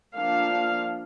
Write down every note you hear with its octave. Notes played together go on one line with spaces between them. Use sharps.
F3 A#3 D4 F5